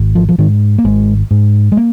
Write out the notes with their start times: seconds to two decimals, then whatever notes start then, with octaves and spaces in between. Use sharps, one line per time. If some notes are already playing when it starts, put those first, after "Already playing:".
Already playing: G#1
0.15 F3
0.29 F3
0.38 G#2 D#3
0.78 A#3
0.84 G#1 G#3
1.31 G#2
1.72 G#3
1.77 A#3